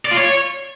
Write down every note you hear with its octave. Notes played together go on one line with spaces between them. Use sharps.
D5
F4
C#5